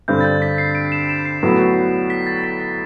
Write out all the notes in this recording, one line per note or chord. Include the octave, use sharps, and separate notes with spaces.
G2 D3 G3 C4 G6
A6
G6
B6
C7
D7
E7
E7
C7
A2 F#3 B3 F#4
B6
A6
B6
B6